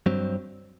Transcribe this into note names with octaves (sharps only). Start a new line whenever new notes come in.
G2 F#3 C4